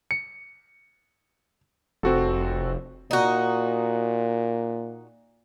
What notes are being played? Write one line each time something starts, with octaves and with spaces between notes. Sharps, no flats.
C#7
F1 C4 F#4 A4
A#2 D#4 F#4